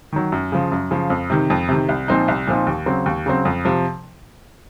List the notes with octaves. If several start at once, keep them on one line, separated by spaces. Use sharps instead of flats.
D#3 F#3
F#2
C#3 F3
F#2
C#3 F3
F2
C3 D#3
F2
C3 D#3
C2
A#2 F3 C4 D#4
C2
A#2 F3 C4 D#4
D#2
C#3 F#3 C4
D#2
C#3 F#3 C4
F2
C3 F3